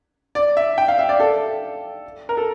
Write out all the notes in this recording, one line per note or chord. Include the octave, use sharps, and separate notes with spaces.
D5
E5
G5
F5
E5
D5
A4
A#4
A4